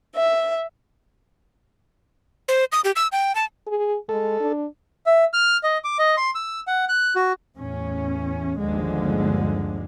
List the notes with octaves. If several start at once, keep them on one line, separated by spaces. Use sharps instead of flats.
E5
C5
D#6
G4
E6
G5
A5
G#4
G#3 A4
D4
E5
F6
D#5
D6
D#5
C6
E6
F#5
F#6
F#4
E2 A2 C#4
G1 D#2 D3 F3 G#3